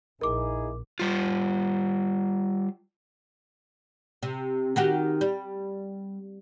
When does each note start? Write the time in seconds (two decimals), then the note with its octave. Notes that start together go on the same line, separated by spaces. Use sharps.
0.21 A#1 D#4 E4 G#4 A#4 D6
1.00 G3 F4
4.23 C3
4.76 D#3 F#4 G4
5.21 G3